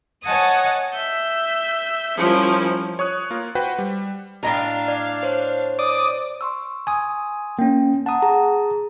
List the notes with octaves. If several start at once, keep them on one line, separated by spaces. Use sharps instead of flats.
C#5 D#5 F#5 G#5 A5 D#6
E5 E6 G6
F3 G3 C#4 E4 A#4
C#5 C#6 D#6 F#6
A#3 F4 A#4
F#4 B4 C5 F#5 G5 B5
G3
A2 D4 D#5 F5 A#5
D5
C5 C#5
D5 D6 D#6
C6 C#6 E6
G#5 D#6
A#3 C#4 G5
F#5 A5 A#5 D#6
G#4 A#5